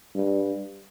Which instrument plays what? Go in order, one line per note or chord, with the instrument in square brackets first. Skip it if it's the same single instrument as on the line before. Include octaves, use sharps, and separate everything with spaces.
[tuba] G2